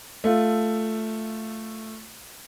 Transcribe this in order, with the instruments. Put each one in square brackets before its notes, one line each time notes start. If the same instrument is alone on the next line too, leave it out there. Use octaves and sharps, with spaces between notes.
[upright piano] A3 F4